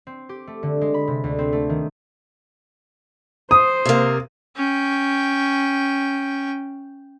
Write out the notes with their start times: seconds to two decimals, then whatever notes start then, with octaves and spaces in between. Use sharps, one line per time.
0.07 C4
0.29 G4
0.47 A3
0.63 D3
0.81 G#3
0.94 B5
1.08 C3
1.24 D2
1.39 C4
1.53 A3
1.69 D#3
3.51 C5 D#6
3.85 C3 A#3
4.56 C#4 G5